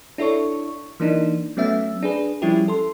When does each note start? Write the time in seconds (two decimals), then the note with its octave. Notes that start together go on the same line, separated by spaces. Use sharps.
0.18 D4 E4 A4 C#5 C#6
1.00 E3 A#3 D4 D#4
1.57 F#3 A3 B3 C#4 E5
2.03 D4 G#4 B4
2.42 F3 G3 C#4 E4 G4
2.68 A4 C6